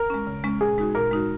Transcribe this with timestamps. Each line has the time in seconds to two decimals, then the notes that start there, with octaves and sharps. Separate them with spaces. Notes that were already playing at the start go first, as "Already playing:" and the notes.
Already playing: A#4
0.10 G#3 C#4
0.27 C#3
0.44 G#3 C#4
0.61 A#2 G#4
0.78 G#3 D#4 F#4
0.95 A#2 A#4
1.11 G#3 D#4 F#4